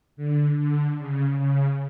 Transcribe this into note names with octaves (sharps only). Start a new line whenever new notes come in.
D3
D3
C#3
C#3